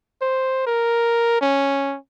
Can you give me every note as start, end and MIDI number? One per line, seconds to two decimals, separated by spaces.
0.21 0.64 72
0.67 1.36 70
1.41 1.97 61